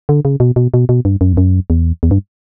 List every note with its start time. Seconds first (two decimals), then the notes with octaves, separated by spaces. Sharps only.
0.09 D3
0.25 C#3
0.40 B2
0.56 B2
0.74 B2
0.89 B2
1.05 G2
1.21 F#2
1.33 E2
1.37 F#2
1.70 E2
2.03 E2
2.11 G2